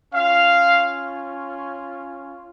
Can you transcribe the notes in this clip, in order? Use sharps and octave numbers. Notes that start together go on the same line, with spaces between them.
C#4 F4 F5